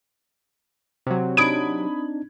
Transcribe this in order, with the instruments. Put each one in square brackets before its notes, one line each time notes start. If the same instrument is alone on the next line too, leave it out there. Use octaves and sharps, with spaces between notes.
[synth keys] C3 F#3
[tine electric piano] C4 D4 D#4 [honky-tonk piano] B5 D#6 G#6 [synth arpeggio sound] D7